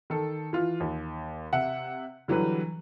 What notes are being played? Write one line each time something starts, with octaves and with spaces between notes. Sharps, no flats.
D#3 A4
E3 F4
D#2
C3 E5 F#5
D3 E3 F#3 G3 B4